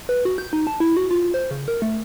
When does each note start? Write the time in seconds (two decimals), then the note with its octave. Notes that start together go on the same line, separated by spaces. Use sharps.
0.09 B4
0.25 F#4
0.38 G6
0.53 D#4
0.67 A5
0.80 E4
0.97 F#4
1.11 F4
1.34 C5
1.51 C#3
1.68 A#4
1.82 A3